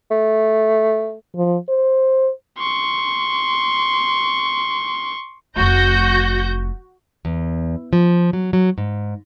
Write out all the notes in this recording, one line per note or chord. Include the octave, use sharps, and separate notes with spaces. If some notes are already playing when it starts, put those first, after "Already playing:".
A3
F3
C5
C6 C#6
F1 A3 F#4 G6 A#6
E2
F3
F#3
F#3
G#2